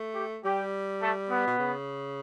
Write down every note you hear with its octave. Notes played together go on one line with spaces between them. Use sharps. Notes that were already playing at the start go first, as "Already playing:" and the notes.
Already playing: A3
G4
G3 G4
A3
B3
B2
C#3